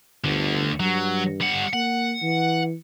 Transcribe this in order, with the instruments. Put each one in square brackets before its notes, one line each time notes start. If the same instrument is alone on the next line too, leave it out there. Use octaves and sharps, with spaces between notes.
[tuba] G1 [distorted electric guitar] D2 D3
[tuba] G2 [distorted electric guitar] F#3
[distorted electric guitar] G3 F#5
[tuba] A#3 [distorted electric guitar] F#5
[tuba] E3